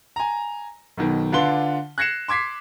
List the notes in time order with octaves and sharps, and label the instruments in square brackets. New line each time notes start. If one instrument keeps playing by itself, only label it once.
[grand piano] G#5 A#5
B1 B2 D#3
D3 D4 F4 B4 C6 G7
F#6 G#6 A#6 C7 C#7 E7
C6 D6 G#6 B6 C7